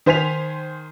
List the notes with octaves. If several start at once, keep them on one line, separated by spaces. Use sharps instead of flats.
D#3 C5 G#5 B6 F7